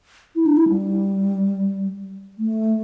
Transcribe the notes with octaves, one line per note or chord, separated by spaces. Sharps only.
E4
D4
E4
G3
A3